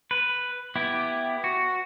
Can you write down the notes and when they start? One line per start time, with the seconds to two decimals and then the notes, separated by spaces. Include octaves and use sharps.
0.11 B4
0.76 B3 E4 G4
1.44 F#4